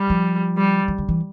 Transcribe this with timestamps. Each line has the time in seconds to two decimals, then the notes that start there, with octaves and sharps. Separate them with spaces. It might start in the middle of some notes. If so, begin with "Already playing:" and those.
Already playing: G3
0.10 F3
0.57 G3
0.88 E3
0.98 D3
1.09 E3